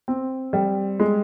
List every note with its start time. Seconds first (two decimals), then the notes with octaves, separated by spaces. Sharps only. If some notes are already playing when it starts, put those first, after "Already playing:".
0.08 C4
0.53 G3
1.00 G#3